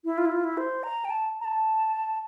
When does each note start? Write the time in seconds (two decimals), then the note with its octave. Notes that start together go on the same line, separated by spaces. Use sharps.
0.05 E4
0.18 F4
0.25 E4
0.32 F4
0.44 E4
0.57 C5
0.83 A#5
1.05 G5
1.10 A5
1.41 A#5
1.45 A5